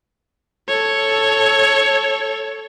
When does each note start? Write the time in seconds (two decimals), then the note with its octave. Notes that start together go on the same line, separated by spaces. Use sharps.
0.68 A4 C#5